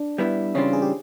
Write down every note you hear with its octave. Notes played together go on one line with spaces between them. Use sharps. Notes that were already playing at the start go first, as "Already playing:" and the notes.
Already playing: D4
G3 B3 E4
C#3 E3 G3 C4 C#4 F4
G#4
G4